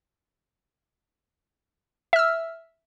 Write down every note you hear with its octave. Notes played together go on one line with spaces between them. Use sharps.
E5 E6 F6